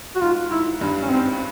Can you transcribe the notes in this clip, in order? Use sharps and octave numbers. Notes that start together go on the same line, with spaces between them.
F#4
G#2 F4
G#2 E4
G2
C#4
G#2 C4